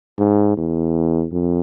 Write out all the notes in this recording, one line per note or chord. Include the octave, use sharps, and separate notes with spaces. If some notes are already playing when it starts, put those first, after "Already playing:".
G#2
E2
F2